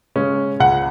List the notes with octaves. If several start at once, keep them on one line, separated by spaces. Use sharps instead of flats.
C#3 G#3 C#4
C#2 F#5